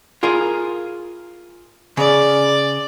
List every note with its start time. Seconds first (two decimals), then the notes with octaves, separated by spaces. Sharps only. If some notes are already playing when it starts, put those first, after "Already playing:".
0.23 F4 G#4 A#4
1.97 C#3 D5